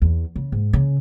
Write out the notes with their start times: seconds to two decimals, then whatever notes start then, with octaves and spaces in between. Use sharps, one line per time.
0.02 E2
0.36 C#3
0.52 G#2
0.73 C#3